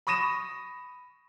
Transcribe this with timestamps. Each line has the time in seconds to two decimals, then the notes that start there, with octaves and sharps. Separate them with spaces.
0.07 B5 C#6 D#6 A#6 D#7 E7